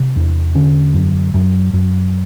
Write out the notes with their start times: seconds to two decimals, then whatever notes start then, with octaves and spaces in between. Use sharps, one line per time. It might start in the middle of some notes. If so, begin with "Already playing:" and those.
Already playing: C3
0.16 E2
0.55 D3 C#4
0.94 F#2
1.34 F#2
1.73 F#2